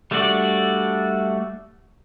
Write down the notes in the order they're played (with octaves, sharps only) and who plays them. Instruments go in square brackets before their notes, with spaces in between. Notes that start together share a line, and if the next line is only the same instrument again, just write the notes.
[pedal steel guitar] G3 A3 D4 F#4 D5